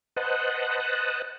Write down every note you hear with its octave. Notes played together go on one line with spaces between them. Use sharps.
B4 C5 D#5 F#5 A5 F#6